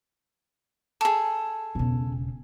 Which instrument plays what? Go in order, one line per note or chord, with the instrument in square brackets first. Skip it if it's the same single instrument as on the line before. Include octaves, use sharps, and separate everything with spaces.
[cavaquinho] G#4 A4
[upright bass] E1 C#3